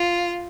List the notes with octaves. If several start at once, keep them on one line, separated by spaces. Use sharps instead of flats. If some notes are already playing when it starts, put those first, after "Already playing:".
Already playing: F4